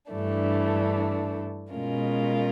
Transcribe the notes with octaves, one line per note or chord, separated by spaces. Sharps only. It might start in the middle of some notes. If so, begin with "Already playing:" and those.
G2 E3 A3 D4
B2 G#3 C#4 F4 A#4